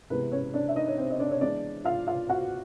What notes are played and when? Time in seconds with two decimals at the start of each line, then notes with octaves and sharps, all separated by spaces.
0.10 C3 E3 G#3 B3 E4 B4
0.32 C#4 C#5
0.54 D4 D5
0.68 E5
0.76 D#4 D#5
0.88 C#5
0.98 C4 C5
1.11 D#5
1.20 D4 D5
1.31 C#5
1.41 E3 G#3 B3 D4 E4 D5
1.85 F4 F5
2.07 F4 F5
2.29 F#4 F#5